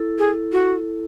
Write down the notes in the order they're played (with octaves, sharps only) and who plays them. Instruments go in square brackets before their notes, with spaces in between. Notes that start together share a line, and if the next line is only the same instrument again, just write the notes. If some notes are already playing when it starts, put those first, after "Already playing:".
Already playing: [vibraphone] E4 A4
[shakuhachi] G#4
F#4